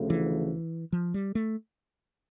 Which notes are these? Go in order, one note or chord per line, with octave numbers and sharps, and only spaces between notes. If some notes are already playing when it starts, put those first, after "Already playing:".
Already playing: D2 C#3 F3 A3
E3
F3
G3
A3